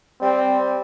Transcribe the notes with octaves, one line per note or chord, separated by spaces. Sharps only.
G3 C4